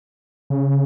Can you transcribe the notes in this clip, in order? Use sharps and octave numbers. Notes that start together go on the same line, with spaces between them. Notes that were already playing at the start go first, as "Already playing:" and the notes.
C#3